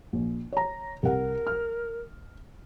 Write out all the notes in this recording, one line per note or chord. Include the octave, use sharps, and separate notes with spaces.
A#1
C#5 A#5
C2 A#4 F#5
F6